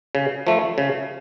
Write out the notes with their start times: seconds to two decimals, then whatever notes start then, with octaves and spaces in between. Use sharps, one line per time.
0.15 C#3
0.47 F3 A3
0.78 C#3